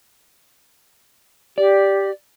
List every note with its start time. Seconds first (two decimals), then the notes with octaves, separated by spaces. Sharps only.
1.58 G4 D5